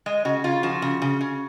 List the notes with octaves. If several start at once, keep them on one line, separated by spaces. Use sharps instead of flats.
G#3 D#5
C#3 F#4
C#3 F4
F3 F#4
C#3
C#3
C#3